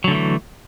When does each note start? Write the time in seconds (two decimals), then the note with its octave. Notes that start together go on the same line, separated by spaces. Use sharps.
0.04 F#3
0.08 D3
0.11 A3
0.15 E3